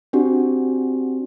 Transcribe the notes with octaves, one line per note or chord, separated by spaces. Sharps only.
C4 D4 F#4 G4